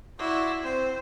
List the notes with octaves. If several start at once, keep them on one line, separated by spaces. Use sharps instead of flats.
E4 F#4 D5 C6
C4 C5